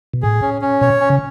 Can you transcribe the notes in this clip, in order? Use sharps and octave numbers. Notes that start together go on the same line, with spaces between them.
B2
A2 G#4
C#4
C#4
B2 C#5
C#4
C#3